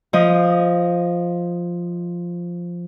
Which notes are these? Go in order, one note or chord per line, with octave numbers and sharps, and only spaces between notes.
F3 D#5